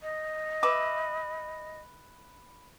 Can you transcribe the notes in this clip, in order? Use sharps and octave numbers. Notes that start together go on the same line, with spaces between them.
D#5
B4 E5 D6